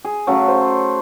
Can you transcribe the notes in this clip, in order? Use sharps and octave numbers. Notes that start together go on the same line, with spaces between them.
G#4
C#3 F#3 A3
C5